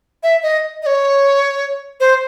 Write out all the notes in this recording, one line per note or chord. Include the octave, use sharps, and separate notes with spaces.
E5
D#5
D#5
C#5
C5